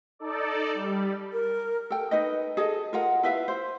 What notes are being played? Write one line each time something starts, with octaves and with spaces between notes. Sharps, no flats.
D#4 A4 D5
G3
A#4
A4 G5
D#4 B4 D#5
G#4 A4 D#5
F4 A#4 F#5
E4 B4 E5 F5
C5